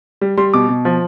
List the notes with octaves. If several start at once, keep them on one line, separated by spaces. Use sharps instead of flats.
G3
G3 C6
B2 D6
B2
F3